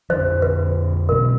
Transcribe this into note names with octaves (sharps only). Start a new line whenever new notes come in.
F2 D3 F3 C5
B4
B1 B2 G#3 A#4